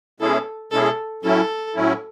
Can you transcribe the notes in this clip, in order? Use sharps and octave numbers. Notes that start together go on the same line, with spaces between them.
B2 G#3 C#4 E4 G#4 A4
B2 G#3 C#4 E4 G#4 A4
A2 F#3 C#4 E4 A4
A2 F#3 C#4 E4